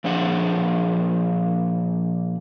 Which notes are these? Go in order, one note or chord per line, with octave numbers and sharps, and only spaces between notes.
A#2 F3 D4 G#4 F#5